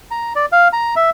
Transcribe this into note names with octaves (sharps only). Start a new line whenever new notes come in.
A#5
D5
F5
A#5
E5